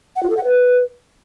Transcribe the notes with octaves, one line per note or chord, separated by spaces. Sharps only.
F#5
F4
A4
F#5
B4